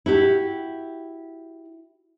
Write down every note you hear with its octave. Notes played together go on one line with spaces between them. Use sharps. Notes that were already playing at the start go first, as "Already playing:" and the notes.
E4 F#4 G4